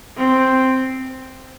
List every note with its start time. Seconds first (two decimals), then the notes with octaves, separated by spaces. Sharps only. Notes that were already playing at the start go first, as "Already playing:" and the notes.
0.17 C4